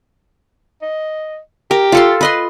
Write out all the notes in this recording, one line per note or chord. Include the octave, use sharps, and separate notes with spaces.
D#5
G4 A#4
F4 A4 C6
B4 D#5 C6